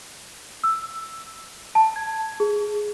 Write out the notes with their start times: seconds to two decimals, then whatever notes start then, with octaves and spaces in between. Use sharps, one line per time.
0.64 E6
1.75 A5
1.96 G#6
2.40 G#4